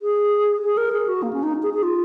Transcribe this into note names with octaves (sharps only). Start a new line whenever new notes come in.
G#4
G#4
A#4
G#4
F#4
A#3
C#4
D#4
G#4
G#4
F4